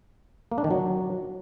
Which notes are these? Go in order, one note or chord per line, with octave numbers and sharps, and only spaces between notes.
A#3
D4
D#3
F#3